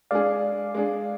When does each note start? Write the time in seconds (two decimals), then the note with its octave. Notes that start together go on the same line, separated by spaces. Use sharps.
0.11 G#3 D4 G#4 D5 F5
0.75 G#3 D4 G#4